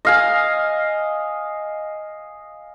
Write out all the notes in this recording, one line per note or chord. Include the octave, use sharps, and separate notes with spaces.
D#5 F5 G#5